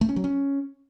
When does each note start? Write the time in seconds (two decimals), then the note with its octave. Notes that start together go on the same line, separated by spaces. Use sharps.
0.01 A3
0.09 C#4
0.16 F#3
0.24 C#4